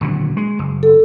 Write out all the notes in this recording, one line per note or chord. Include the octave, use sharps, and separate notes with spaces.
D#1 D3 F#3
G#3
F#1
A4